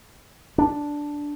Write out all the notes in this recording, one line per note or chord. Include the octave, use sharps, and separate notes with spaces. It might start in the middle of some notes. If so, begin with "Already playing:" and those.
D4